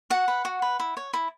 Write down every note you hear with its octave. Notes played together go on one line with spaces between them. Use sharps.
F#4 F#5
B4
F#4
B4
E4
C#5
E4